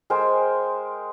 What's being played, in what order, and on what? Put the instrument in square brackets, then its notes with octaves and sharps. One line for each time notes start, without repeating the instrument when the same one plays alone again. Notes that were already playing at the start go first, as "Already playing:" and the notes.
[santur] G#3 A#4 C5 G5